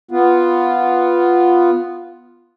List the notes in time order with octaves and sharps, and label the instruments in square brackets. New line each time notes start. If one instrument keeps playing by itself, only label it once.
[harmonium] B3 F4